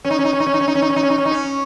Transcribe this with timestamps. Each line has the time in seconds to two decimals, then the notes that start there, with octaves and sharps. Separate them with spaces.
0.05 C#4
0.10 D#4
0.19 C#4
0.25 D#4
0.33 C#4
0.40 D#4
0.46 C#4
0.54 D#4
0.61 C#4
0.68 D#4
0.75 C#4
0.82 D#4
0.90 C#4
0.96 D#4
1.03 C#4
1.10 D#4
1.18 C#4
1.25 D#4
1.31 C#4